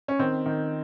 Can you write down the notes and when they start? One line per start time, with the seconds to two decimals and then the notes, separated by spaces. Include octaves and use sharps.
0.08 C#4
0.19 D#3 C4
0.46 D#3